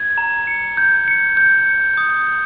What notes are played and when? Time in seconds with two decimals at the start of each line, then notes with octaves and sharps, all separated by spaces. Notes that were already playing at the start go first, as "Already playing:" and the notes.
Already playing: G#6
0.18 A#5
0.47 C#7
0.77 G6
1.08 C#7
1.37 G6
1.67 C#7
1.97 D#6
2.27 G6